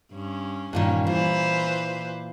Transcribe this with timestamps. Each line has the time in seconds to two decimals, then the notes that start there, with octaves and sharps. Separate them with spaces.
0.13 G2 C#4
0.73 G2 A#2 D#3 E3 C#4
1.07 A#2 E3 B4 C5